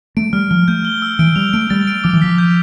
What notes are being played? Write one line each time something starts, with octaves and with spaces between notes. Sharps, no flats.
A3 D7
G3 F6
F3 F6
A3 G6
G7
E6
E3 D7
G3 F7
A3 D7
G3 A6
D7
F3 D6
E3
F3 B6
G6